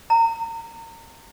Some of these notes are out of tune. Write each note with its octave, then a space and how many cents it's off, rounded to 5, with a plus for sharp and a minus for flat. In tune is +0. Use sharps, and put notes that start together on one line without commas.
A#5 -30